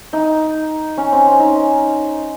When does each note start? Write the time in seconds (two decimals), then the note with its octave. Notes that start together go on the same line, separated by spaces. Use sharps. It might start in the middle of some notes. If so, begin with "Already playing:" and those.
0.13 D#4
0.97 C#4
1.12 C4
1.26 C#4
1.39 D#4